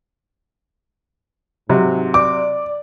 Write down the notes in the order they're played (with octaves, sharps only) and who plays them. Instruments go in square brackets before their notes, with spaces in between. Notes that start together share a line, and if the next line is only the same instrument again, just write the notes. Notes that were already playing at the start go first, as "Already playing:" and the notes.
[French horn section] G#2 [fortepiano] C3 F#3
[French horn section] D5 [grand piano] D6